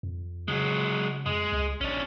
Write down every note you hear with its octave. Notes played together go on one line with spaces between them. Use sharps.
F2
C#3 F#3 G#3
F2 G#3
C#2
A#1 C#4 D4